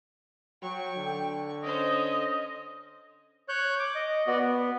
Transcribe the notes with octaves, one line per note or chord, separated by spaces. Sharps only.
F#3 G5 C#6
D3
C#4 C5 D#5 D#6
C#5 F#6 G6
D6
D#5
B3 F#4 D5
B3